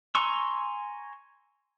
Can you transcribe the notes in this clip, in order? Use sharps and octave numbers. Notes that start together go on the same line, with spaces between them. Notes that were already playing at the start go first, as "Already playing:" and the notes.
G#5 A#5 C6 C#6 E6